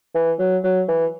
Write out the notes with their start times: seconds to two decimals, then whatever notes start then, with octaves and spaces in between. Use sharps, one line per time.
0.15 E3
0.39 F#3
0.64 F#3
0.88 E3